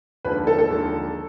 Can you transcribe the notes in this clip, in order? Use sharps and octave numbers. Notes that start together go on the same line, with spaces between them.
D#2 D3 F3 G#3 B4
A4
A4
D#2 D3 F3 G#3